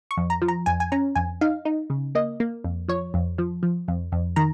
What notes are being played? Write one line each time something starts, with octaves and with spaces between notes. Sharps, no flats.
C#6
F2
A#5
F3
A#5
F2 G#5
G#5
C#4 A#5
F2 G#5
D#4 F5
D#4
C#3
A#3 D#5
A#3
F2
F3 C#5
F2
F3
F3
F2
F2
D#3 A#5